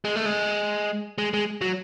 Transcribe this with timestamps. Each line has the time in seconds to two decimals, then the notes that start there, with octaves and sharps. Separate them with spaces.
0.05 G#3
0.16 A3
0.26 G#3
1.18 G#3
1.34 G#3
1.61 F#3